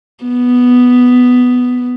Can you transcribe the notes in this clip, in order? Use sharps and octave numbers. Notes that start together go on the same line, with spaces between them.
B3